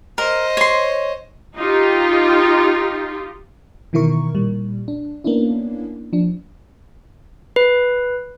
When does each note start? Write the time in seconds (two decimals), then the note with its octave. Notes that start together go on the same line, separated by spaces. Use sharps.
0.18 A#4 C5 D#5
0.57 C#5 C6
1.58 D#4 F4 G4
3.93 B2 D#3 E3 E4 A#4 C#6
4.35 A#2 G3
4.88 D4
5.24 A#3 B3 C#4 D4 E4
6.13 F3 D4
7.56 B4